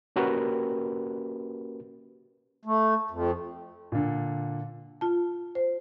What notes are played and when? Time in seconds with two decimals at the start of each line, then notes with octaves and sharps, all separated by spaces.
0.16 A#3 C#4 F#4 G4 A#4 B4
2.65 A3
3.11 F2
3.92 A#2 D3
5.01 F4 A5
5.55 C5